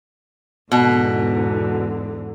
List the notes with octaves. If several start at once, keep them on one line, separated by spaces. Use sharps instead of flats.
E2 G#2 B2 D3